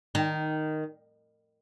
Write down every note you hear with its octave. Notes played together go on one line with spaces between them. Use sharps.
D#3